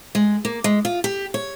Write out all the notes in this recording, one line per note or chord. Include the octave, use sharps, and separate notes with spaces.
G#3
A#3
G#3
F4
G4
C#5